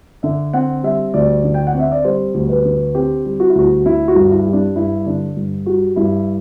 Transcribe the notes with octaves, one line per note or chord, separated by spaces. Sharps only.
D3 E5
C4 F#5
G3 E5
D2 D5
D3
G5
F#5
C4
E5
D5
G3 C5
D2
B4
D3
C4 G4
G3
F#4
E4
D2 F#4
D3 E4
F#4
G2
E4
G3
D4
G2 E4
D3 D4
G2
G3 F#4
G2 E4